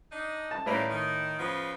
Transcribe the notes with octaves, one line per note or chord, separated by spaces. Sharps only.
D4 D#4
A5
A2 D#3 G3 A#3 B4 A#5
D#3
C#3 F3 B3